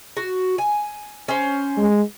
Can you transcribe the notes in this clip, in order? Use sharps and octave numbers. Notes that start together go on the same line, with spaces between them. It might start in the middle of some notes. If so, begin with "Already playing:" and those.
F#4
G#5
C#4 C5
G#3